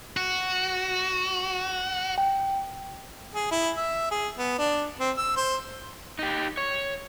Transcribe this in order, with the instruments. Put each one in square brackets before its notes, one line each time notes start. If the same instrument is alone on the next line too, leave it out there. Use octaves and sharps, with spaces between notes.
[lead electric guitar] F#4
[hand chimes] G5
[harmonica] G#4
E4
E5
G#4
B3
D4
C4
E6
C5
[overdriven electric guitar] D#4 G4
C#5